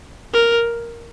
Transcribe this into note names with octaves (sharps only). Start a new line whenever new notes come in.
A#4